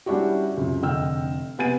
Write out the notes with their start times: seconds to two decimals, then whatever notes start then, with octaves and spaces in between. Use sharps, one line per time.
0.06 G3 C#4 D4 E4 F#4 G4
0.56 C#2 F#2 C3
0.82 F1 D3 D#5 G5 E6 F6
1.58 C3 B3 G#5 A6 D#7